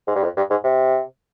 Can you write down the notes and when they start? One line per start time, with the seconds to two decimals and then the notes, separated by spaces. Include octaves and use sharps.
0.07 G#2
0.15 G2
0.24 F2
0.37 G2
0.50 G#2
0.64 C3